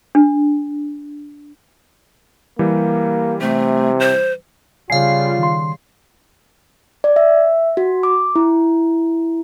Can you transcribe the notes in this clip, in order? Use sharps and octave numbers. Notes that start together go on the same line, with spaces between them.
D4
E3 G3 A#3 G4
C3 A3
C5
C#3 G3 F4 F5 G#5 C7
D#3 C6
D5
E5
F#4
D6
E4